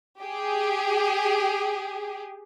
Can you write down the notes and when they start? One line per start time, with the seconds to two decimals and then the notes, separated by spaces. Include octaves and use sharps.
0.20 G4 G#4